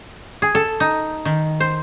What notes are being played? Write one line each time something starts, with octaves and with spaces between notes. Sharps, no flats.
G#4
A4
D#4
D#3
C5